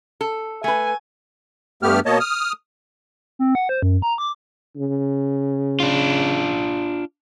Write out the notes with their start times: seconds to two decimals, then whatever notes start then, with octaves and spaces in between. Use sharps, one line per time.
0.21 A4
0.64 A3 B4 G#5
1.83 G2 A3 B3 G4 F6
2.06 B2 A#3 C#5 D#5 A5
2.20 D#6 F6
3.39 C4
3.55 F#5
3.69 C5
3.82 F#2
4.02 A#5
4.18 D6
4.77 C#3
5.80 D4 F4